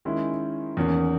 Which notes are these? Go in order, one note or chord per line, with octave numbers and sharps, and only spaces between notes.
D#3 G#3 C#4 E4
E2 D#3 A#3 C#4